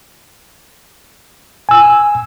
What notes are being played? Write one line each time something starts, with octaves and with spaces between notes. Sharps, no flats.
G#5 E6